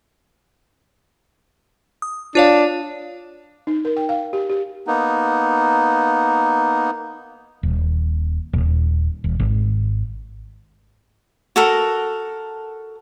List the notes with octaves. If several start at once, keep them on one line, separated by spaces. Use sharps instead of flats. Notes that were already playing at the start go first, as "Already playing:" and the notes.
D#6
D4 F4 C#5 F5
D#4
A#4
G5
F5
G4
G4
A#3 B3 D#4
D#1
D#1
D#1
G#1
F#4 A4 A#4